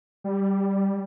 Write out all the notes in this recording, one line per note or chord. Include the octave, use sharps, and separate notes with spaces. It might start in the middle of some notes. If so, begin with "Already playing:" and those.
G3